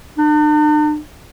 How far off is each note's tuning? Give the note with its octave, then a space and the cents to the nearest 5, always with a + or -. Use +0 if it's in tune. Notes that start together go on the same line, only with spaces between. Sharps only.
D4 +45